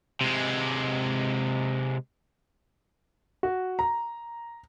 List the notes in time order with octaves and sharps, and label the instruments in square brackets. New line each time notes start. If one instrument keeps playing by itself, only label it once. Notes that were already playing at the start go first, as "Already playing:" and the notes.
[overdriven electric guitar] C3 G#3
[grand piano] F#4
A#5